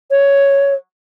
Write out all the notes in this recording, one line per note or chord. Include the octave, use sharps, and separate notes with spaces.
C#5